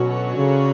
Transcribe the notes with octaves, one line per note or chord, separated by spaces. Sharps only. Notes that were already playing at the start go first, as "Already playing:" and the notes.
Already playing: B2 D3 F#3 C#4 F#4 C#5
C#3